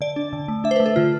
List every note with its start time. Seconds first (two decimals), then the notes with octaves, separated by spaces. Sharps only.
0.01 D3 D5
0.16 D4
0.33 D3
0.48 A3
0.64 D4 E5
0.71 C5
0.76 B4
0.80 A3
0.86 A4
0.96 D3 F4